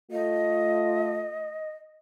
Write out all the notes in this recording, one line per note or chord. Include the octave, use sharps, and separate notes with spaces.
A3 F4 D#5